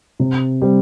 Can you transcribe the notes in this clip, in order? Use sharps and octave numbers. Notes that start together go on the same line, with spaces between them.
C3
G3 C4